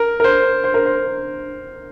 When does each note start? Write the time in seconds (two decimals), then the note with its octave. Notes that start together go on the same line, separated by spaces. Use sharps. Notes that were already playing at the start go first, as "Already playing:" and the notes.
Already playing: A#4
0.20 A#4
0.24 C5
0.64 C5
0.74 A#4
0.86 C5